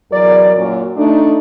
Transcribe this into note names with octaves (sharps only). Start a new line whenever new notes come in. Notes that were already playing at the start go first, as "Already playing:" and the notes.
E2 F#3 A#4 D5
F#2 A#2 F#3
A3 D4 D#4